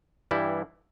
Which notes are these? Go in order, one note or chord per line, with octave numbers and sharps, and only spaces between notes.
G2 E3 G3 E4